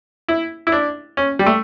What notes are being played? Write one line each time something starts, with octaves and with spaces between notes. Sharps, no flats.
E4
E4
D4
C#4
G3
A3